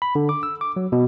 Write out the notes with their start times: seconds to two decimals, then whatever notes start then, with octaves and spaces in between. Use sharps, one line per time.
0.02 B5
0.15 D3
0.29 D6
0.43 E6
0.61 D6
0.76 F#3
0.92 B2